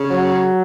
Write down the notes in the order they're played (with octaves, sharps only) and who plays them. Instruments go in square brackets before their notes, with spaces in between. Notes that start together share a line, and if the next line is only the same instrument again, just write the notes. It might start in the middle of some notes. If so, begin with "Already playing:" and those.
Already playing: [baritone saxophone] C#3
[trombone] F#3